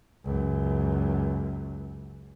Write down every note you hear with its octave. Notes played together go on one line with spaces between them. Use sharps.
C#2 F#2